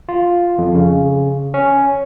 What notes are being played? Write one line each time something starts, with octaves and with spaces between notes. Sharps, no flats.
F4
F2
C#3
C#4